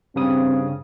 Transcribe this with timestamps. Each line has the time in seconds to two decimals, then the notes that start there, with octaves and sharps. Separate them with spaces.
0.16 G2 C#3 C4 D#6